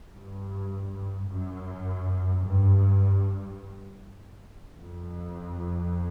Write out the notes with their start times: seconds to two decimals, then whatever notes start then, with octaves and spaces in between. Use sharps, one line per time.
0.13 G2
1.28 F#2
2.45 G2
4.76 F2